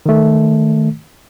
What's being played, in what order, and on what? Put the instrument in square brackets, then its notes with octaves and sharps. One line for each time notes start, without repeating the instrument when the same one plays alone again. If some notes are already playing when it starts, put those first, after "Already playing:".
[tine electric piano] D#3 A3